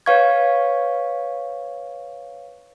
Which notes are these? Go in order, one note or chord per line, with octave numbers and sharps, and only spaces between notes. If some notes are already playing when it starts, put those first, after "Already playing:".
B4 C#5 F5 C#6 G#6